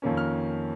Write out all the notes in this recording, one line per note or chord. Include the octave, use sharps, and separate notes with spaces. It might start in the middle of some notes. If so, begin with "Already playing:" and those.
F2 D#3 A#3 C#4
F6